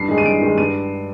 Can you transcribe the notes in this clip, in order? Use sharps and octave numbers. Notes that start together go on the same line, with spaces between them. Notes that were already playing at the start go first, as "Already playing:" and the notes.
Already playing: G2 C7
D#3 G#3
D#7
G2 D7
D#3 G#3
G2 D#7